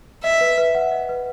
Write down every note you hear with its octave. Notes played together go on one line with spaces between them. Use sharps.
D#5 E5
B4
B4
F#5
D#5
B4